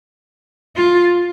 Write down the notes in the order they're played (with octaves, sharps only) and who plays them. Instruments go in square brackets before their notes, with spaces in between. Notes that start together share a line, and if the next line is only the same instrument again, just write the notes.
[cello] F4